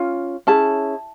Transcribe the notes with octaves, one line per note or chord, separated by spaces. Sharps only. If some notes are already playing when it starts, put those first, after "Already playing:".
Already playing: C#4 F4
C#4 E4 G#4 A5